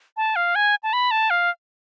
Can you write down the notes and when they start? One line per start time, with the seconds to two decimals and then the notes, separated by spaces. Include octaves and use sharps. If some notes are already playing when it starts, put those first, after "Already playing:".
0.17 A5
0.36 F5
0.55 G#5
0.83 A5
0.93 B5
1.11 A5
1.30 F5